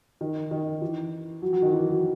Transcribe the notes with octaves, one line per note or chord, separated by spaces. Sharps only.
D#3
D#3
E3
F#3
F#3
D#3
E3
F#3